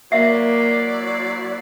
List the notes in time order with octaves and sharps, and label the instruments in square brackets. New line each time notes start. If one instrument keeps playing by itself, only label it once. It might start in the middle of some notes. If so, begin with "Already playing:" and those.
[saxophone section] F#3 E4 D5 [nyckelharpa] A#3 [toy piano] E5 F5 [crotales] B6 C7